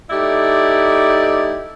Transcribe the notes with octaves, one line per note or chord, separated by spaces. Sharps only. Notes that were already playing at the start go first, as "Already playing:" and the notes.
A3 D#4 E4 G4 D5